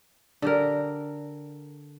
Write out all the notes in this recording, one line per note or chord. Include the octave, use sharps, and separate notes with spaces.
D3 G4 A#4